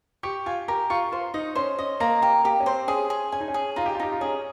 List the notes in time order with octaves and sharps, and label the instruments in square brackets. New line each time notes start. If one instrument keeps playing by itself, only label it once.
[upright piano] G4 [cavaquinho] C#6
[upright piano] F4 [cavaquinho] G#5
[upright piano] G4 [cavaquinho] A#4
[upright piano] F4 [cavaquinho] C#6
[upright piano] F4 [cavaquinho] C5
[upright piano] D#4 [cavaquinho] D#5
[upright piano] C#4 [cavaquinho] C5
[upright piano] C#4 [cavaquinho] D#5
[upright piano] A#3 [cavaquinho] A#5
[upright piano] A#3 [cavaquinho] G4
[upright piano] A#3 [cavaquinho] G4
[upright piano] C#4
[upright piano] C4 [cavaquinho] C5
[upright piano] C#4 [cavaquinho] G#4
[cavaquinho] G#4
[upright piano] C#4 [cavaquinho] G#5
[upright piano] D#4
C#4
[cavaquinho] G#4
[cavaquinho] D#4 [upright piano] F4
[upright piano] G4
F4
[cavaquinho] D#4 [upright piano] G4
[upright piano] F4
[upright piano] C#4 [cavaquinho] G#4